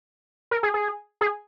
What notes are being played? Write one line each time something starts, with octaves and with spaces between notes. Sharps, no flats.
A#4
G#4
G#4
G#4